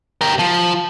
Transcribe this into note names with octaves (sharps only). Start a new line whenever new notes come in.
G4 A#4
F3